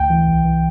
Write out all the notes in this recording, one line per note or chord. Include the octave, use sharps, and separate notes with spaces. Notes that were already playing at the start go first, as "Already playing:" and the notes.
Already playing: D2 G5
E3
C2
E3